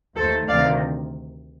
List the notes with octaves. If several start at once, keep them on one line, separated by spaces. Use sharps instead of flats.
D#2 D#3 A3 A4 C5
D2 C3 D#3 D5 F5